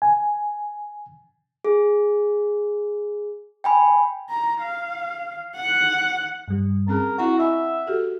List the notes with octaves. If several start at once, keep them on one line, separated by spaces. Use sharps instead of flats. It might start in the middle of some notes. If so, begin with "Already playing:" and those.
G#5
G#4
G5 G#5 B5
A#5
F5
F#5
G2 G3
C4 C#4 G#4 A#4
C4 E4 F#4 F#5 A#5 C#6
D#5 E5 G#5 B5
F#4 G4 A4